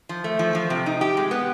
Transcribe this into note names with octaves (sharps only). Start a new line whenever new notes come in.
F3
A3
F3
F3
C3
D#4
G4
G#3
B3